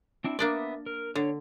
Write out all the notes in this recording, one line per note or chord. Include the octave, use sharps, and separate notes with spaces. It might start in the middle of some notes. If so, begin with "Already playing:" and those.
C4 D4 E4
A#3 B3 D4 D5 E5 D#6
A#4
D3 D4 C#5